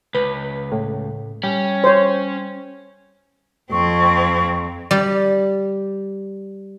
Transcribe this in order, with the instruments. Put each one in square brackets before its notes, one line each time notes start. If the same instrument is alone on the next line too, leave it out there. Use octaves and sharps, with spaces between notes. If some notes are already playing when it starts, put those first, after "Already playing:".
[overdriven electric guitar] C#2 [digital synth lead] B4
[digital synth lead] A2
[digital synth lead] G3 [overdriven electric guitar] C#4
[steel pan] C5 C#5
[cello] F2 C4 [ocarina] C#6
[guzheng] G3 D5